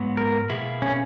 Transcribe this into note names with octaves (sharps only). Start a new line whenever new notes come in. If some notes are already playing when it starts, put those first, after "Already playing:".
Already playing: G#2 F#3 B3
A#4
B2 A#3 E4 G#4
C#4